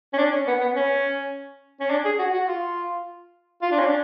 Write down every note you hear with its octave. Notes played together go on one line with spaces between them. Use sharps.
C#4
D4
C#4
B3
B3
C#4
C#4
D4
G#4
F#4
F#4
F4
F4
D4
C#4
D4